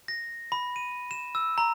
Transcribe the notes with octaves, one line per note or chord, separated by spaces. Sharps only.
A#6
B5
D#7
E7
E6
A#5